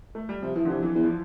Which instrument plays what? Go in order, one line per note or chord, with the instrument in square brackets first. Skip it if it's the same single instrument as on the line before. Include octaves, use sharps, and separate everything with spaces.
[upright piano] A3
G3
[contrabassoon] C3 [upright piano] F3
[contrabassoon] E3 [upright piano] F3
[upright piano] D3
[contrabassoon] C3 [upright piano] E3
[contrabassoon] F2 [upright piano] E3
[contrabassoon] E2
[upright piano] F3